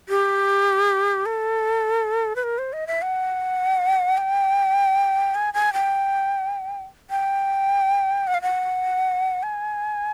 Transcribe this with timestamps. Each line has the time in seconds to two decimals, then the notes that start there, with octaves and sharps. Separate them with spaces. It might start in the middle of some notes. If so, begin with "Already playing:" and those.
0.09 G4
1.26 A4
2.36 B4
2.43 A#4
2.58 C5
2.73 D#5
2.87 E5
3.02 F#5
4.18 G5
5.35 G#5
5.54 G#5
5.73 G5
7.10 G5
8.27 F#5
8.34 F5
8.42 F#5
9.43 G#5